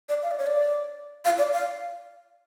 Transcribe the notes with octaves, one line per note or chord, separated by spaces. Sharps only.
D5
F5
D5
C#5
D5
F5
D5
F5